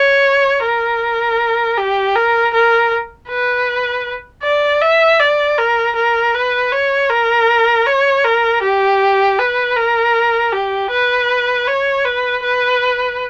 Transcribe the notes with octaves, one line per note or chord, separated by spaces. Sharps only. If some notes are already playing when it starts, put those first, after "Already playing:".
Already playing: C#5
A#4
G4
A#4
A#4
B4
D5
E5
D5
A#4
A#4
B4
C#5
A#4
C#5
A#4
G4
B4
A#4
G4
B4
C#5
B4
B4